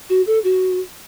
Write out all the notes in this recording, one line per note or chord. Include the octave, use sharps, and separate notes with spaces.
F#4
A4
F#4